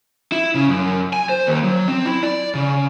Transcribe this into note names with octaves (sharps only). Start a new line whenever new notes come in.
E4
C#3
F#2
G#5
C5
D#2
F#3
C4
E4
D5
C#3